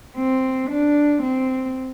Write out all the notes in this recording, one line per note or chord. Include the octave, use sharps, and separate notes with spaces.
C4
D4
C4